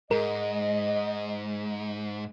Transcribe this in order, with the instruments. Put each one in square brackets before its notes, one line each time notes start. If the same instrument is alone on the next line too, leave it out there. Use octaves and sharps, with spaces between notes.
[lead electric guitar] G#2 [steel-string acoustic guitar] G#3 [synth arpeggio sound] A#4 [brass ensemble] D#5